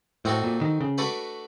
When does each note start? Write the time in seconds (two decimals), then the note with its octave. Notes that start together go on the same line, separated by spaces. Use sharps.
0.25 A2 C4 D#4 F#4 A4
0.44 A#2
0.61 D#3
0.80 C#3
0.98 A3 D4 F#4 B4 D5